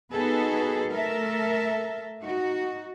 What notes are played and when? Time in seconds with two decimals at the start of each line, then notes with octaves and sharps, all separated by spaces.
0.13 B3 D#4 F#4 G#4 A4 B4
0.92 A3 A4 A#4 E5
2.21 D#4 F#4